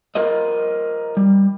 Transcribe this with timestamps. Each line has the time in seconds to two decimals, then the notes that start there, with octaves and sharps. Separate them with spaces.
0.15 F4 A#4 C5 D#5
1.17 G3